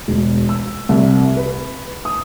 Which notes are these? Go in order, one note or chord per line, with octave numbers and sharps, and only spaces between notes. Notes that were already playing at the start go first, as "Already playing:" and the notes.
E1
E6
C2
B4
D#6